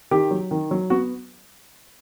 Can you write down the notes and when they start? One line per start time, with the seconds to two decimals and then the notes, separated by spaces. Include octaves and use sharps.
0.11 D#3 G4
0.31 F#3
0.51 D#3
0.71 F#3
0.90 B3 F#4